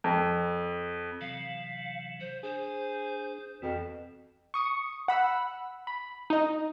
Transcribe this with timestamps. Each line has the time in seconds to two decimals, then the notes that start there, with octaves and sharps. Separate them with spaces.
0.04 F2
1.21 C3 E3 F#3 F5
2.20 C5
2.43 D4 G#4 C5
3.62 F2 B2 E3
4.54 C#6 D#6 C#7
5.08 F#5 B5 E6 F#6
5.87 B5
6.30 D#4 D#5